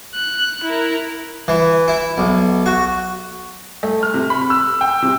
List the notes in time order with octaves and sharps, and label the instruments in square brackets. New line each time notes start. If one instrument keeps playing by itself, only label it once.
[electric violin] F#6
E4 A#4
[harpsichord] E3
E4
B1
F#4
[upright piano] A3
F6
C3
B5
E6
G5
C3